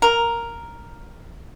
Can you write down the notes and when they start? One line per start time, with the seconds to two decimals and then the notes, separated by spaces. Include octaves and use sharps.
0.02 A#4